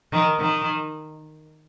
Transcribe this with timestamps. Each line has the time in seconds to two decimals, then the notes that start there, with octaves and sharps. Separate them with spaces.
0.12 D#3
0.40 D#3